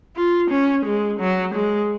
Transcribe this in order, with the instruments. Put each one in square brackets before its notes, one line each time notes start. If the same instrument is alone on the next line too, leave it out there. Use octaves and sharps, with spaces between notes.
[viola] F4
C#4
G#3
F#3
G#3